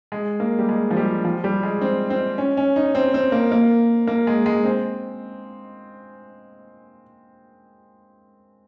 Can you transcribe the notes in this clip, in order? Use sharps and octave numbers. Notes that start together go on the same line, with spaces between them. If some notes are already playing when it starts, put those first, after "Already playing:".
G#3
A#3
G3
G#3
F3
G3
F3
G3
G#3
C4
C4
C#4
C#4
D#4
C4
C4
A#3
A#3
A#3
G#3
G#3
C4